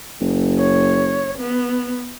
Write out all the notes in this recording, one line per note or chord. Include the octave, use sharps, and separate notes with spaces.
F#1
C#5
B3